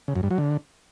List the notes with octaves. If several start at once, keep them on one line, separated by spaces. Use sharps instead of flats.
C#3
F#2
G2
F#3
D3